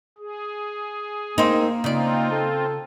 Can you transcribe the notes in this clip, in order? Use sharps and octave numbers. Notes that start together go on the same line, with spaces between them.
G#4
A#3 C4 D#4 A#4
C#3 C4 D#4 F4 D5
A4